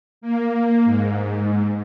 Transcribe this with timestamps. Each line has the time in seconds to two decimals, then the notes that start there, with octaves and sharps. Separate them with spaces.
0.21 A#3
0.85 G#2